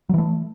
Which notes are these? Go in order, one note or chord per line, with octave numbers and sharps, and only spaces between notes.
E3 F#3 A3